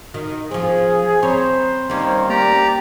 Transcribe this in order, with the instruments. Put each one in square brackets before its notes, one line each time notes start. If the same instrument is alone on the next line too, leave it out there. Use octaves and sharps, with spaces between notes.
[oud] D#3 [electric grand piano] F#4
[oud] F3 C4 [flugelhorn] G#4
[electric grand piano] C4 A#5 B5 [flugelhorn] C5 [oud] C#5
[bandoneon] D#3 A#3 [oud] G3 C#4
[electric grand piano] A#3 [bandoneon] G4 D5 A#5